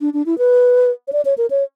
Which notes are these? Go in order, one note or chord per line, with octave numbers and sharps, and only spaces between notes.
D4
D4
E4
B4
C#5
D5
C#5
A#4
C#5